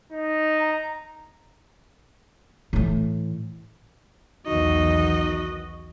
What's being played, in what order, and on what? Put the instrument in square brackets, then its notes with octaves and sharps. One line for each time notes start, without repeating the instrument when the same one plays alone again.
[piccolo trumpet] D#4
[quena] A#5
[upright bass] A2 E3
[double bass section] B1 E2 D#3 [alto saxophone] D#4 [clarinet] F#4 [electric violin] D#5